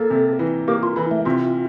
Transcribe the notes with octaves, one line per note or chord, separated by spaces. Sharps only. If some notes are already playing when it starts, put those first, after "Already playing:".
Already playing: A#3 A4
C3
E3
A#3 G4
F4
E3 E4
A3
C3 F4